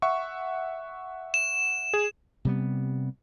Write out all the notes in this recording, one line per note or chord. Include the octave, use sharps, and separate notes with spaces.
E5 F#5 C#6
E7
G#4
C3 G3 B3